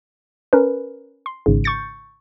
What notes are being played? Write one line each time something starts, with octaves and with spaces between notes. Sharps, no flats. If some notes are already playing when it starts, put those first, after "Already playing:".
C#4 A#4 B4
C6
G#1 G#2 C#3
C#6 G6 A6 C#7